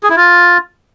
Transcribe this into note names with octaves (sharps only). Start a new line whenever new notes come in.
G#4
E4
F4